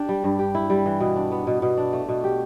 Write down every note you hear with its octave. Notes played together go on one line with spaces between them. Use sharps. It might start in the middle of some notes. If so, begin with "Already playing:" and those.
Already playing: D4 G4
G3
G2
G4
E4
G3
E3
B2
D4
B3
B2
B2
D4
A3
B2
G4